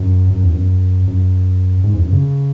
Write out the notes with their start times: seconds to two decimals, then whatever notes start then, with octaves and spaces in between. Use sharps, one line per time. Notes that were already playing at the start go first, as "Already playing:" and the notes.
Already playing: F#2
0.30 F#2
0.43 E2
0.54 F#2
1.07 F#2
1.84 G#2
1.94 E2
2.04 F#2
2.13 C#3